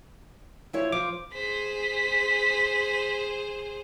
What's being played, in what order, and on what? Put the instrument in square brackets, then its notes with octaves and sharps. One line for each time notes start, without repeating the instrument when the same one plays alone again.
[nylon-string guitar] F3 E4 C#5
[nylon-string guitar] F3 [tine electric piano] D6
[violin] G#4 C5 [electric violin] B6